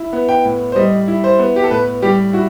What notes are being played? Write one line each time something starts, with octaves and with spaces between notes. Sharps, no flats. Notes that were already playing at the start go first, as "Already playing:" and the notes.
Already playing: E4
B3
G5
A2
C5
G3 D#5
E4
C5
B3
G4
A4
A2 B4
G3 G4
E4 F#4